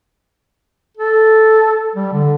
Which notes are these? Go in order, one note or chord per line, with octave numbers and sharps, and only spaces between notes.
A4
G3
D3